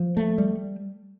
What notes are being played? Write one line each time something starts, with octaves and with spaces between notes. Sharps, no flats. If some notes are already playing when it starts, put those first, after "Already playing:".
Already playing: F3
A3
G3